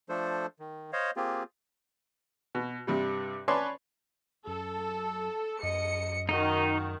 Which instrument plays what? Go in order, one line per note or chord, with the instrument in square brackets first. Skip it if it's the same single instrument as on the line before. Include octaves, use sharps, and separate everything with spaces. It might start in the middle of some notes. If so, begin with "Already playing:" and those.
[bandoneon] F3 A3 D4 A4 C5
D#3
C5 C#5 D#5 F5
A#3 C4 F4 G4 G#4
[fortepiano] B2
G2 C3 G3
C#4 B4 C#5 D5 A5 C6
[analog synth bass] F#2 [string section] A4
[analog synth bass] F#2 [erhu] D#5 [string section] C#7
[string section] D#3 [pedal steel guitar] D#4 D#5 [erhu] F#4